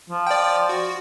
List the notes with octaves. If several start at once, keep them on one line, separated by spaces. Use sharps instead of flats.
F3
D5 G5
F#4